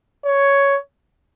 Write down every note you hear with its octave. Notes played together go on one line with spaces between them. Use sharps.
C#5